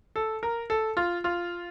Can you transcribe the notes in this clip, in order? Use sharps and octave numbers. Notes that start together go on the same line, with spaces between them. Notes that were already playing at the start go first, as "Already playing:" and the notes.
A4
A#4
A4
F4
F4